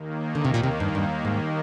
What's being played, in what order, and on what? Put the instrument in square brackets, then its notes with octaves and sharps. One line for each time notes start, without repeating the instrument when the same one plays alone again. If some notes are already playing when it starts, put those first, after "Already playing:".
Already playing: [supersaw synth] D#2 D#3 A#3
[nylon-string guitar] D3
C3
A#2
C3
G2
G2
G#2